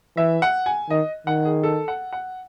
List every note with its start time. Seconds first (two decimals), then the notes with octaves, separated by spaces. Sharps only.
0.17 E3 E5
0.42 F#5
0.66 G#5
0.90 D#3 D#5
1.27 D#3 F#5
1.45 G#4
1.63 A4
1.88 F#5
2.13 F#5